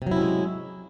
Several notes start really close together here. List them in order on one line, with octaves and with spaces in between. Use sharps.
C3 F#3 E4 C#4 G#3